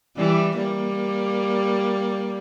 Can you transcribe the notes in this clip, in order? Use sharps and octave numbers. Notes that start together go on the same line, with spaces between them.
E3 G3
G3 A#3